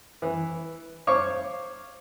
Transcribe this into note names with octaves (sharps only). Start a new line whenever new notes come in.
E3
C5 C#5 F5 C#6 D6